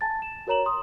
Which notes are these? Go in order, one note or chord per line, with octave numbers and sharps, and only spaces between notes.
G#5 A5 A6
E7
F#4 A#4 C#5 A#5 E7 F#7
C6 D#6